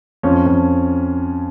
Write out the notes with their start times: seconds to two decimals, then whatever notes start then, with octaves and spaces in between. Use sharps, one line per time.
0.23 F2 C#4
0.46 F2